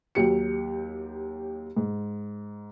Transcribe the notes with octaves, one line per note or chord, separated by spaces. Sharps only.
D#2 F#3 G4 C#7
G#2